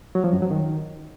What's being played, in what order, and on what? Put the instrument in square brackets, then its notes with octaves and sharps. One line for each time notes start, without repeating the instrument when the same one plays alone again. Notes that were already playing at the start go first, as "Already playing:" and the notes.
[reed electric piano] F#3
F3
F#2
F#3
D#3